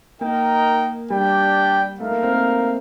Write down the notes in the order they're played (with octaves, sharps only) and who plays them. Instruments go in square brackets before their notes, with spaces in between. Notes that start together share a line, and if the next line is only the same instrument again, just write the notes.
[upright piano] A#3 [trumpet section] D#4 A#4 D#5 G5
[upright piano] G3 [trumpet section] D4 G4 D5 G5
[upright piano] A3 [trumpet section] D#4 A#4 F5
[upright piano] A#3
C4
A#3